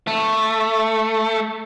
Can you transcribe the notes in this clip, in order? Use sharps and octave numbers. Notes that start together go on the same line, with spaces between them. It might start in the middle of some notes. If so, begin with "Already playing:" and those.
A3